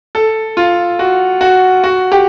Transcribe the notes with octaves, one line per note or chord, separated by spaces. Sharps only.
A4
F4
F#4
F#4
F#4
G4